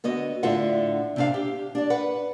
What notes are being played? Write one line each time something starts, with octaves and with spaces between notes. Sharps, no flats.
D3 B3 F#4 D#5
A2 D3 D4 F4 E5 F#5
C3 D4 F5
G4
D4 D5
B4 F#5